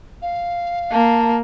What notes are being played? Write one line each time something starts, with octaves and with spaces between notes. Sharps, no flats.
F5
A#3 A5